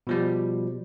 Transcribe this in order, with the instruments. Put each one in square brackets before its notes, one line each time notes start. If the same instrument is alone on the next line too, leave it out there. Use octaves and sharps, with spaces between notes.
[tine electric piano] B2 F3 G3